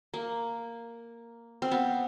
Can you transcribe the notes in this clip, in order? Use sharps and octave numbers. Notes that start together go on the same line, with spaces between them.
A#3
C4
B3